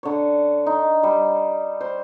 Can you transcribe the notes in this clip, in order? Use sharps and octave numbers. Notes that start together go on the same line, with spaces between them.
D3 C#5
D#4
G3
C5